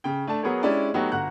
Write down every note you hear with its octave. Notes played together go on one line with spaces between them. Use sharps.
C#3 G5
A3 D4 A5
F#3 B3 G#4 A#4 C#5
G#3 C#4 D4 E4 G4 D5
F#3 A3 B3 D#4 F#4 G4
G1 F#4 F#5 A#5 F#6